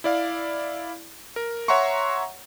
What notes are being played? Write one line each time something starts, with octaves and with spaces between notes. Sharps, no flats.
E4 D5 F5
A#4
C#5 E5 F#5 A#5 C6 C#6